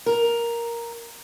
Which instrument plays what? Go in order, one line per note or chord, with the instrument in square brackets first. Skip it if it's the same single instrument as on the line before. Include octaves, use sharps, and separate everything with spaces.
[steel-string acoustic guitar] A#4